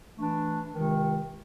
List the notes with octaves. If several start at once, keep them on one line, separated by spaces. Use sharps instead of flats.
E3 A3 D4
C#2 C3 D#3